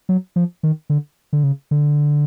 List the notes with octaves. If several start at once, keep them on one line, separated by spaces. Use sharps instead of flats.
F#3
F3
D#3
D3
D3
C#3
D3